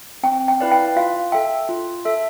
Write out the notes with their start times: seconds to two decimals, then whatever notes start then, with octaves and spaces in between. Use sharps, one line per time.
0.23 C4 G5
0.48 G5
0.60 E4 B4 D5 F5
0.71 G5
0.96 F4 F5
1.32 A4 E5 G5
1.69 F4
2.05 A4 E5